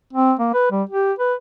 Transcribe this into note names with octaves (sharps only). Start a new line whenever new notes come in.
C4
A#3
B4
G3
G4
B4